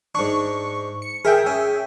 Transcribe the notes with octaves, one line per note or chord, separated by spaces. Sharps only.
G#2 D4 C#6
C#7
G#4 A#4 E5 G5
C#4